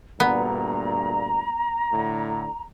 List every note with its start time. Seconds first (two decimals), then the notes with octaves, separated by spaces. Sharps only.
0.20 D2 G2 A#2 B3 A#5
1.92 A2 D3